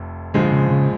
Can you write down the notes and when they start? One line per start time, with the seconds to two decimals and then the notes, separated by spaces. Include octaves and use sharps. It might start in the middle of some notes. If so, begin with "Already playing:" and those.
Already playing: F1 F2
0.34 A#1 G#2 D3 F3 G#3
0.52 C#3
0.71 C#3